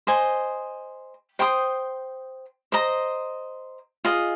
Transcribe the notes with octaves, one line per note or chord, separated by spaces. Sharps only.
C5 D#5 G#5
C5 G5 C6 D#6
C5 D#5 A#5
F4 G#4 D#5